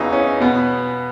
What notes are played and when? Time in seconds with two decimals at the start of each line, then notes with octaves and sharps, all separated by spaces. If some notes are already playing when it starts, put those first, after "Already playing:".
Already playing: E2 C#3 E3 D#4
0.13 C#4
0.40 B2 B3